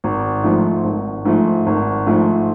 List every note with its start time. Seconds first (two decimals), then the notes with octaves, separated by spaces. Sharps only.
0.04 G#1
0.43 G#2 F3 A3
0.84 G#1
1.25 G#2 F3 A3
1.66 G#1
2.07 G#2 F3 A3